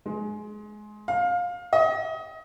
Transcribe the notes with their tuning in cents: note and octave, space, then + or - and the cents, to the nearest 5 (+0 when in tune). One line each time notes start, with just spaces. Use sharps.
G#3 +20
F5 +20
D#5 +25